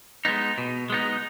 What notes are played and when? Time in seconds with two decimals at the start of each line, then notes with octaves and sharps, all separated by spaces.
0.25 G#3 B3 D#4
0.58 B2
0.90 G#3 B3 D#4